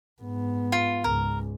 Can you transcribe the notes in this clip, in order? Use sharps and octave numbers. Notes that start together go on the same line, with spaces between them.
G#2 B3
F4
C#2 G#2 A#4